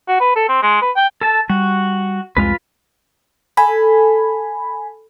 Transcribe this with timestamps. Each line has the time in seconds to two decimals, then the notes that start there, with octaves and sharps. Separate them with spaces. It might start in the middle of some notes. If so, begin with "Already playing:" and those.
0.08 F#4
0.21 B4
0.36 A4
0.49 C4
0.63 G#3
0.82 B4
0.97 G5
1.21 A4 A5
1.50 G3 F#4
2.37 C2 F2 G#3 F4 B4
3.57 A4 G#5 B5